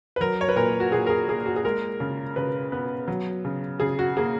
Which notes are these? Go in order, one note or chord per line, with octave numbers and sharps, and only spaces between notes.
B4
F#3 A#4
C#5
B4
A#2 A#4
F#4
A#2 G#4
A#4
G#4
A#3 G#4
F#4
G#4
G#3 A#4
C#3
C#3 B4
B3 B4
F#3
C#3
C#3 G#4
F#4
A#3 G#4